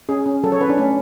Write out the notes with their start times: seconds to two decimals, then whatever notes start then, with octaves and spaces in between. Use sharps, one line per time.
0.09 C#4 G#4
0.26 C#4
0.44 F#3 A4
0.52 C#5
0.60 C#4 B4
0.69 D4
0.78 A3 C#4